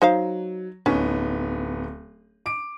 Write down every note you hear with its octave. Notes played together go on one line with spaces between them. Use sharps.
F#3 D#4 C5 F5
D1 B3 C#4 D#4
D6 D7